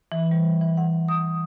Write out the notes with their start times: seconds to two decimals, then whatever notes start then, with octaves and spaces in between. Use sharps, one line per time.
0.12 E3
0.31 G3
0.61 E3
0.77 F#5
1.09 D#6